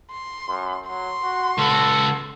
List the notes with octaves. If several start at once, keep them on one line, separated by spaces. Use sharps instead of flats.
C6
F#2
F#3 C6
F#4
C#2 F#4 A4